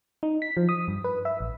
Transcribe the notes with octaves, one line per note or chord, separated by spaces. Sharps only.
D#4
B6
F3
D#6
G2
B4
E5
A1